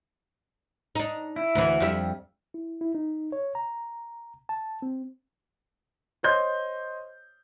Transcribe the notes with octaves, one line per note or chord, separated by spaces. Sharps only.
D4 D#4
E4
D2 E3
F2 G3 E5
E4
E4
D#4
C#5
A#5
A5
C4
C5 C#5 D#5 C6 G6